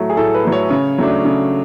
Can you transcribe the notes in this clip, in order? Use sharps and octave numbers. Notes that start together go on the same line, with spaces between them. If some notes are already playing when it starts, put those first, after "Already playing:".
Already playing: A2 F#3 A3
G#4
A2 A4
B4
F#3 A3
C#5
C#3
F#3 A3 D4
C#3